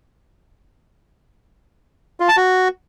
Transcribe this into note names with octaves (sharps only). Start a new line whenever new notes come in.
F4
A5
F#4